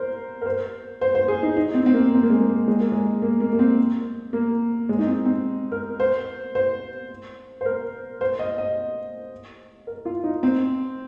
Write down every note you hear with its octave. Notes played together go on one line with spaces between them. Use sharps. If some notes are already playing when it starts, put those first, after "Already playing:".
Already playing: A#4 C5
A#4
C5
C5
C5
G#4
D#4
D#4
C4
C4
A#3
C4
A#3
G#3
A#3
G#3
A#3
G#3
A#3
A#3
A#3
C4
A#3
G#3
D#4
C4
C4
A#4
C5
C5
C5
A#4
C5
D#5
D#5
A#4
F4
D#4
C4